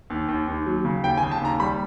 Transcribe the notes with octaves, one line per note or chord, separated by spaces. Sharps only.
D#2
D#2
D#2
F#3
C#3
D#2 G5
G#5
C#3
A5
D#2 A#5
G3 B5